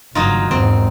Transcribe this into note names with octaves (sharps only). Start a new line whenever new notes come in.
F#1 G2 D#3 F#3 D#4 F4
E2 G#2 D#3 C4